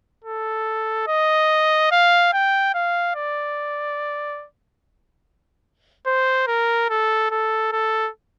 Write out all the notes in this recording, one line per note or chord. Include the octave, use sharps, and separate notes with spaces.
A4
D#5
F5
G5
F5
D5
C5
A#4
A4
A4
A4